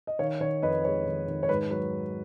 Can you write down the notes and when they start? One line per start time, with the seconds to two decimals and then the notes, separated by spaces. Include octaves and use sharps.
0.07 D#5
0.19 D#3 C#5 F5
0.40 D#3 C#5
0.62 F2 B4 D#5
0.84 G#3 C#5
1.06 D#3
1.28 D#3
1.43 C#5
1.49 G#2 B4
1.71 F#3 B4